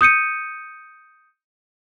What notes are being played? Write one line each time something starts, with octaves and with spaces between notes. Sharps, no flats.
D#6 G6 C#7 D#7